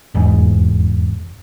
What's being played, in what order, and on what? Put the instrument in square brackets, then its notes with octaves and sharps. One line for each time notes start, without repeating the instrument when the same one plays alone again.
[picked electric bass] F1 E2 G#2